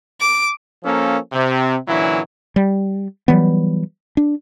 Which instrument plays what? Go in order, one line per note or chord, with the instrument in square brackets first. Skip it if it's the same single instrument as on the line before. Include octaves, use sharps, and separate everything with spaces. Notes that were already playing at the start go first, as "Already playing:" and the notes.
[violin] D6
[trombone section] F3 A#3 C#4 A4 A#4
C3
A#2 D3 E3 F#3 C#4 E4
[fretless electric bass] G3
E3 F#3 G3 B3
D4